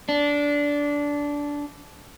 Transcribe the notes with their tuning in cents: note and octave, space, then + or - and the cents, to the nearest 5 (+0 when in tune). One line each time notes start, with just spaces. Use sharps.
D4 -15